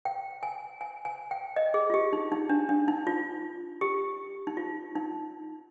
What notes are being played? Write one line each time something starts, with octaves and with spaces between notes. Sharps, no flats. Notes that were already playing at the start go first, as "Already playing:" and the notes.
G5
G#5
G#5
G#5
G5
D#5
G#4
F4
G4
D#4
D#4
D4
D4
D#4
F4
G4
D#4
F4
D#4